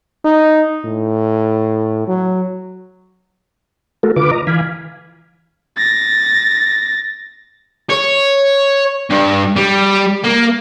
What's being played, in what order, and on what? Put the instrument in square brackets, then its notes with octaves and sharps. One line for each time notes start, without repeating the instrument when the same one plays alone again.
[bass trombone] D#4
A2
F#3
[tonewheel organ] A3 F#4 A4 A#4
D3 F4 B4 D6
D#5 A#5
E3 F5 G#5 B5
[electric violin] A6 A#6
[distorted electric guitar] C#5
G2
G3
A#3